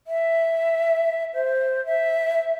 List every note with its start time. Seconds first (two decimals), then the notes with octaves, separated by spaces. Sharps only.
0.07 E5
1.34 C5
1.86 E5